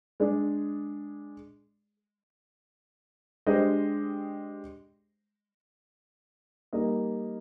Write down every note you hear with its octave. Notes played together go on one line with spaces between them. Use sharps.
G#3 D4 G#4 D5
G#3 D4 G4 C5 D#5
G3 A#3 D#4 A#4 D#5